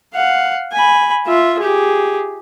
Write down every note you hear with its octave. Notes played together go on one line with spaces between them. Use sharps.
F5 F#5
G#5 B5
F4 E5
G4 G#4